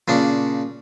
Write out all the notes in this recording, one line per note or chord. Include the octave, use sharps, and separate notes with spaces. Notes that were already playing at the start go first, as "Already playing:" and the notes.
A#2 C#3 D4